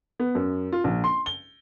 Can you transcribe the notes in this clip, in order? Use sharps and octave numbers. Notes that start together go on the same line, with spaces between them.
B3
F#2
F4
A#1
C6
G7